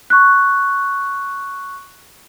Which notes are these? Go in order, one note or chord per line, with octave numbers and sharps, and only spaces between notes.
C#6 F#6